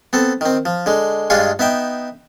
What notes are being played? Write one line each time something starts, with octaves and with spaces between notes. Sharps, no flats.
B3 C4 A4
D#3 C4
F3
D3 G#3
G2 G#3 D4 F4 G#4 C#6
B3 D#4 E5 G5